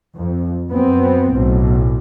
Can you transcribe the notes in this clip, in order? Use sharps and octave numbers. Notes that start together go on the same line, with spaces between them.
F2
F#2 B3 C4
B1 A2